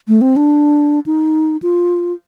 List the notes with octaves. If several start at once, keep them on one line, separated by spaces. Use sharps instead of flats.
A3
C4
D4
D#4
F4